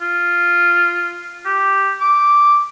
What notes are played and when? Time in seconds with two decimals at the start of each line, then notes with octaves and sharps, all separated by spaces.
0.01 F4
1.46 G4
2.01 D6